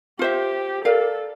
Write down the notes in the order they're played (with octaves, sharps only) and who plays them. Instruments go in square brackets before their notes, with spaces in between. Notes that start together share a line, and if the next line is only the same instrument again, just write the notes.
[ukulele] F4 C5 E5 [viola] G4
[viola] A4 [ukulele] A#4 D5 F5